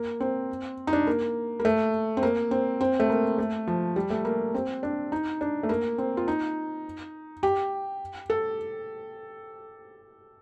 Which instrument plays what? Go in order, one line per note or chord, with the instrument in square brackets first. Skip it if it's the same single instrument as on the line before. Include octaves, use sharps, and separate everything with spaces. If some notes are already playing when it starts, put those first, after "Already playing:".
Already playing: [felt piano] A#3
C4
D#4
D4
A#3
A#3
A3
C4
A#3
C4
C4
A3
A#3
A3
F3
G3
A3
A#3
C4
D4
D#4
D4
A3
A#3
C4
F4
D#4
G4
A4